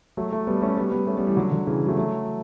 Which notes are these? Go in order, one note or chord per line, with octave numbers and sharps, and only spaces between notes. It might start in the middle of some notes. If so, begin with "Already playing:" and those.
F#3 A3
F#3 A3
G3 B3
A3 C#4
G3 B3
G3 B3
A3 C#4
G3 B3
E3 G3
D3 F#3
D3 F#3
C#3 E3
F#3 A3
F#3 A3